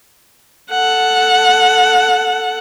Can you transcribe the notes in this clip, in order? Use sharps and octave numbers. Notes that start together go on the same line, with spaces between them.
A4 F#5